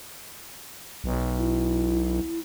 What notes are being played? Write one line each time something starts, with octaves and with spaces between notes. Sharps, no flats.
B1
E4